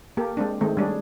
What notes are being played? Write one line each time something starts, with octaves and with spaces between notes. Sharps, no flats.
A#3 G4 A4
G#3 C4 D4
D#3 G#3 A3 C4
G3 C#4 D4 G#4